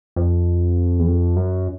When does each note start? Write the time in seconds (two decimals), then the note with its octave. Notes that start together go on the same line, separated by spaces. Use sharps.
0.16 F2
0.99 E2
1.06 F2
1.37 F#2